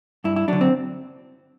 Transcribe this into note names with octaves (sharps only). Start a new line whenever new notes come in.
G2 E4
E4
D3 F#3 D4
C4